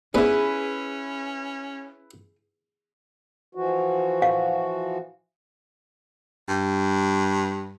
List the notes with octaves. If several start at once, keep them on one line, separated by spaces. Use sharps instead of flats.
G#2 B3 C#4 D4 E4 G#4 B4
E3 F3 F#4
F5
G2